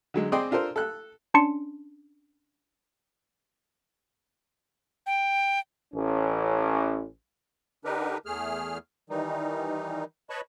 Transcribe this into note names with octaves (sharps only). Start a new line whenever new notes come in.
D3 F#3 G#3
C4 G#4 D5 D#5 G5 C6
D4 F4 A4 A#4 C5
A4 F#6
C#4 D4 A5 C6 C#7
G5
A1 C#4
D3 D4 D#4 G4 A#4 B4
E2 A3 G#4 F6
D#3 E3 G3 D#4
B4 C#5 D#5 A5 B5 C#6